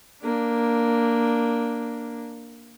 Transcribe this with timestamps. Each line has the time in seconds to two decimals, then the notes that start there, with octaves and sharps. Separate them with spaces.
0.22 A#3 D4